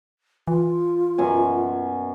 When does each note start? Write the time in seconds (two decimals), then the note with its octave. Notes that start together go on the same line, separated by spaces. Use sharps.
0.48 E3 F4
1.18 F#2 B2 G#5